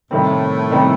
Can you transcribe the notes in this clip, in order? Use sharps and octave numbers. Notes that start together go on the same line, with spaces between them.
A2 C3 D#3 G3 A3 C4
C3 D#3 G3 C4